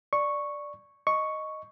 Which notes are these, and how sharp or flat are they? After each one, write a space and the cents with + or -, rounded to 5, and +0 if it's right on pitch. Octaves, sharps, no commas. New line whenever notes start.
D5 +0 C#6 -5
D#5 +0 C#6 +0